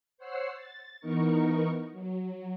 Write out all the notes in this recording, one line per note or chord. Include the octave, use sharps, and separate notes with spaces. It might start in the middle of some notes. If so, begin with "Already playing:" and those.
C5 C#5 F#5 E6 C7
A6
E3 B3 D#4 A#4 C#6
F#3